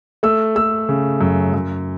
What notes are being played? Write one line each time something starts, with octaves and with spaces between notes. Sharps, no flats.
A3 E6
A3 E6
C#3
F#2
F#2